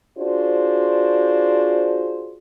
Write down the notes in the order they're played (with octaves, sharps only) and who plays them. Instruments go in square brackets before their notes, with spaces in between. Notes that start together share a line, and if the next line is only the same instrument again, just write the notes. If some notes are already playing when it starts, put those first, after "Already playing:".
[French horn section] D4 F4 F#4 G#4 C5